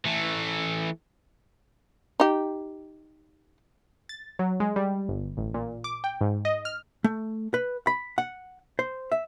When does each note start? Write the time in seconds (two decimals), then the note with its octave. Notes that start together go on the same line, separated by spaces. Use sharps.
0.06 E3 A3
2.20 D#4 G4
4.09 A6
4.39 F#3
4.60 G#3
4.76 G3
5.09 G1
5.37 A1
5.54 A#2
5.84 D6
6.04 G5
6.21 G#2
6.45 D#5
6.65 F6
7.04 A3
7.54 B4
7.87 B5
8.18 F#5
8.79 C5
9.12 E5